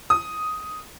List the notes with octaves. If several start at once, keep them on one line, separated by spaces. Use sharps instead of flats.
D#6